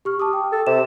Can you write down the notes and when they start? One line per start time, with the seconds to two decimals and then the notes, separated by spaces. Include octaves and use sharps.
0.05 G4 C#6 F6
0.20 A5 D6 D#6
0.33 G5
0.52 A4
0.67 C3 E7